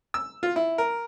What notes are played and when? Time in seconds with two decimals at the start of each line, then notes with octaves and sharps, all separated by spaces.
0.14 E6
0.43 F4
0.56 E4
0.78 A#4